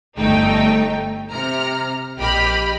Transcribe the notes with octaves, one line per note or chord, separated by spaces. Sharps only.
G1 A3 D#4 G5
C3 A#5 F6
A#1 G4 D#5 B5 F6